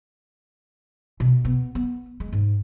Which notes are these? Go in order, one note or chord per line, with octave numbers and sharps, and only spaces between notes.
B2
B3
B3
G#3
G#2